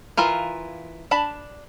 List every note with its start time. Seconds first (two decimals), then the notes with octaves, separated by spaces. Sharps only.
0.17 E3 F4 A#4 F5
1.11 D4 A5 B5